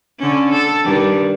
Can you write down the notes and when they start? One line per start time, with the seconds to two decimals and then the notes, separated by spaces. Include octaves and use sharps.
0.19 D3 C#4
0.52 A4
0.84 G2 D#3 G3